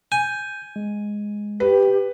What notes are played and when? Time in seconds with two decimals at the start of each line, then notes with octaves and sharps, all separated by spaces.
0.12 G#5 G6
0.76 G#3
1.60 G4 B4